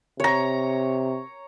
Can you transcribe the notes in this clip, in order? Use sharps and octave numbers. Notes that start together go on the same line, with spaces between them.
C3 C#5 A#5